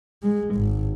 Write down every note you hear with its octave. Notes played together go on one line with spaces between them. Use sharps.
G#3
G#1